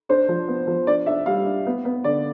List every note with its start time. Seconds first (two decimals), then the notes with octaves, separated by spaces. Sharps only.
0.09 D4 C5
0.29 F3
0.48 B3
0.67 F3
0.87 D4 D5
1.06 D4 E5
1.26 G3 F5
1.46 D4
1.66 B3
1.85 B3
2.04 D3 D5